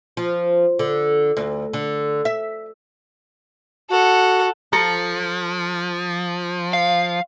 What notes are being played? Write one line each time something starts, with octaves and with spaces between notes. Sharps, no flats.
F3
D3
D2
D3
E5
F#4 A4 F#5
F3 A4 A#5
F5